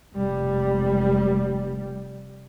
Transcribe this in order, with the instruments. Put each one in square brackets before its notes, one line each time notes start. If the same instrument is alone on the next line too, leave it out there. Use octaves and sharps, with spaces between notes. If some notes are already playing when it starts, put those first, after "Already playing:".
[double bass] F1 G3